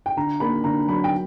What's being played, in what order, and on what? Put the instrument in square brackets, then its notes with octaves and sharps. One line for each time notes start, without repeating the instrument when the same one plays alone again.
[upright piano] G5
D3 A#5
A#3 B5
D3 A#5
F#3 B5
G5